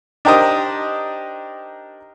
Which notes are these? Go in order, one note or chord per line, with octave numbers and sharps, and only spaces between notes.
D4 D#4 G4 A#4 C5 D#5